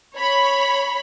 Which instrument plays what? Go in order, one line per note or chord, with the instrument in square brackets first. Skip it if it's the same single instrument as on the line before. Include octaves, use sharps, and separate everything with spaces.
[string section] C#5 B5